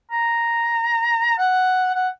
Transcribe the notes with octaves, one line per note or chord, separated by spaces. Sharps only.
A#5
F#5
F#5